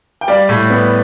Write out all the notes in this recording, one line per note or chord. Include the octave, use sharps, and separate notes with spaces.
G5
G3 D5 F5
A2
B3